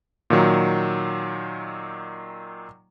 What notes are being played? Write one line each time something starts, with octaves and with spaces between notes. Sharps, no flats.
A#2 D#3 F#3